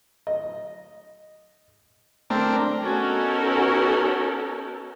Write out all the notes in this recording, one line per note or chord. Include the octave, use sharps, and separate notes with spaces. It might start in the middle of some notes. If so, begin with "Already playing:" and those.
D#5
A3 C4 D4 A#4
B3 C#4 D#4 F#4 A4 A#4